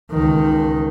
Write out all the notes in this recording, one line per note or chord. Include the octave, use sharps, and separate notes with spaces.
C#2 D#3